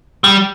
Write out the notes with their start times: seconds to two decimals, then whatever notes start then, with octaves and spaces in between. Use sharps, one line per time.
0.24 G3